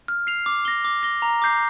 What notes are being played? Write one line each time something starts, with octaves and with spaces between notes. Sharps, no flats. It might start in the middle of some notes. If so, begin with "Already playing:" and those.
F6
C7 F7
D6
A#6 G7
D6
A#6 G7
A#5
D6 G6 C7